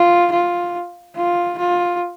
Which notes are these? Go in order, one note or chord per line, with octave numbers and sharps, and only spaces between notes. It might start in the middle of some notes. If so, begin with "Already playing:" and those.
Already playing: F4
F4
F4
F4